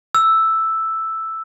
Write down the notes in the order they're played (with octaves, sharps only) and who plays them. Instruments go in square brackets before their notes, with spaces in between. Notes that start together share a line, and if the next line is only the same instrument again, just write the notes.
[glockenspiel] E6